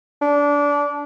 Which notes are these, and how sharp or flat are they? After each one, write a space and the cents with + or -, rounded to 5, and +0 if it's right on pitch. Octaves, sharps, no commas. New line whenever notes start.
D4 -20